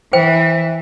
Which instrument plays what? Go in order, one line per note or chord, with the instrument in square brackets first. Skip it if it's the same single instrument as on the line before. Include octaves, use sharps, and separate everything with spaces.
[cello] E3 [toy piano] C5 G5